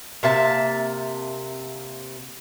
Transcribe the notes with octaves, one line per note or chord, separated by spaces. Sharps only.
C3 A#3 E5 A5